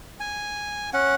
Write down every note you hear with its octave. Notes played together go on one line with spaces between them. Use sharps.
G#5
C#4 F#5